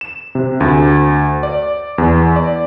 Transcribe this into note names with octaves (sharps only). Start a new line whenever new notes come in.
E7
C3
D2
D5
E2
D5